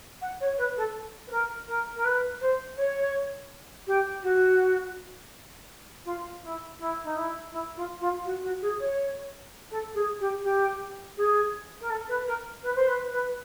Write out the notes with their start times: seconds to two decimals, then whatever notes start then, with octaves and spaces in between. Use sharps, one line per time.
0.21 F#5
0.40 C#5
0.57 B4
0.77 A4
1.27 B4
1.30 A#4
1.68 A#4
1.95 A#4
2.04 B4
2.40 C5
2.77 C#5
3.86 G4
4.23 F#4
6.05 F4
6.42 E4
6.78 E4
7.03 D#4
7.15 E4
7.51 E4
7.76 F4
8.00 F4
8.25 F#4
8.43 F#4
8.61 G#4
8.79 C#5
9.71 A4
9.94 G#4
10.20 G4
10.43 G4
11.17 G#4
11.80 A#4
11.89 A4
12.08 B4
12.27 A#4
12.63 B4
12.75 C5
12.87 B4
13.11 B4